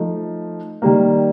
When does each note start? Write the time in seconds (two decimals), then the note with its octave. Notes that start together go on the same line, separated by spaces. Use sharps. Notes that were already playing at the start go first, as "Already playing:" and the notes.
Already playing: F3 A3 D#4
0.82 D#3 G3 A#3